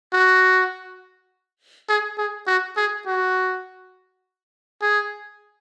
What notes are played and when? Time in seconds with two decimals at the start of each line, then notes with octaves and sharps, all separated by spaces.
0.13 F#4
1.89 G#4
2.18 G#4
2.47 F#4
2.77 G#4
3.06 F#4
4.82 G#4